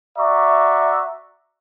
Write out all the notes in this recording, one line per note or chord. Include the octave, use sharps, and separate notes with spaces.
F#4 D5 E5 A#5 C#6